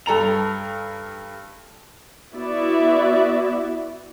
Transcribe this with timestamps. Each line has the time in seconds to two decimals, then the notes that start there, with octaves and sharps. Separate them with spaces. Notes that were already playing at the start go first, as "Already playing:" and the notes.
0.06 G2 A4 A#5 F7
2.34 B3 E4 F#4 D5 E5